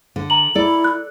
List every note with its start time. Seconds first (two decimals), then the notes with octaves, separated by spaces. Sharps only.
0.16 D3
0.30 A#5 F#7
0.55 E4 A4 D5
0.84 F#6